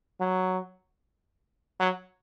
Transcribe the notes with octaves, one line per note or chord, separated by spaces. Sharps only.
F#3
F#3